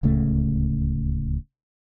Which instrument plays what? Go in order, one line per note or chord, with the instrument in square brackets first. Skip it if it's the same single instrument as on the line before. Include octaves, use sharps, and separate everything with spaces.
[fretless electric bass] D1 C#2 C#3 A3